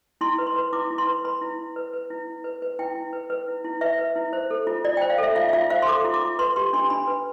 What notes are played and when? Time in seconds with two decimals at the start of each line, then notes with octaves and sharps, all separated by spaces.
0.21 E4 C6
0.38 B4
0.47 C6
0.56 B4
0.73 E4 D6
0.91 E4
0.98 C6
1.07 B4
1.25 B4 B5
1.41 E4
1.59 E4
1.76 B4
1.93 B4
2.10 E4
2.27 E4
2.44 B4
2.62 B4
2.79 E4 G5
2.95 E4
3.13 B4
3.30 B4
3.48 E4
3.64 E4
3.81 B4 E5
3.99 B4
4.16 E4
4.33 C5
4.51 A4
4.67 F4
4.85 F4 D5
4.97 C5 G5
5.10 F5
5.18 A4 E5
5.35 F4 F5
5.49 E5
5.53 F4 F5
5.70 C5 F5
5.82 C6
5.87 A4 D6
6.04 F4
6.14 D6
6.22 F4
6.39 B4 C6
6.56 G4 C6
6.73 D4 C6
6.90 D4 B5
7.07 B4